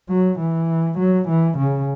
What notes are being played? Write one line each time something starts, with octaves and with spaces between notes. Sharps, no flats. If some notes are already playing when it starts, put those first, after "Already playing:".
F#3
E3
F#3
E3
C#3